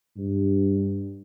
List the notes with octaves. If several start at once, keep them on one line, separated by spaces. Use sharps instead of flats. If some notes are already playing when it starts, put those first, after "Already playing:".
G2